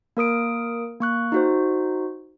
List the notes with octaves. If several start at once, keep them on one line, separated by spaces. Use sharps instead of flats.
A#3 A#4 D#6 D7
A#3 C#6 F#6
D#4 F#4 C5